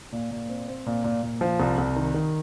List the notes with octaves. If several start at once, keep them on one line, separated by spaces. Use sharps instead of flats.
A#2
A#2
C4
C4
A#2
A#2
A#2
F3
C2
C2
D#3
D#3